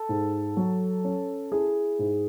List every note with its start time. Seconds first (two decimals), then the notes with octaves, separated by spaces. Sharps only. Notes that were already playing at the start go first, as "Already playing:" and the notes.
Already playing: A4
0.09 G#2
0.57 F#3
1.04 C#4
1.52 E4 G#4
1.99 G#2